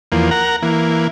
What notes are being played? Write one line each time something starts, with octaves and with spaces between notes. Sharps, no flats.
E2 F3 A#3
A#4 F#5 A#5
E3 A#3